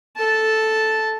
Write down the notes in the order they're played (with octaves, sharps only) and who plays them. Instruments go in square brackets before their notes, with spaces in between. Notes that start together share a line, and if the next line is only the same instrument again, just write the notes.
[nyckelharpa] A4 A5